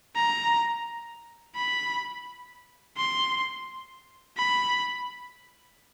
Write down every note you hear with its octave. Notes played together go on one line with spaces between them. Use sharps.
A#5
B5
C6
B5